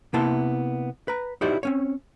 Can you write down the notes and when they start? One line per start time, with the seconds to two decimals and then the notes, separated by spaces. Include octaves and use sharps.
0.13 C3 A#3 B3 E4 A5 C6
1.08 B4 A#5
1.41 D#4 E4 F#4 G4 C5 D5
1.63 C4 C#4 C#5